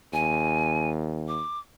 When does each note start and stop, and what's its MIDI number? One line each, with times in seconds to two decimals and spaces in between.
0.13 1.41 39
0.13 0.89 80
1.28 1.59 86